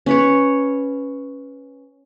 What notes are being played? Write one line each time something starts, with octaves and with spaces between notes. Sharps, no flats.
C#4 B4 C#5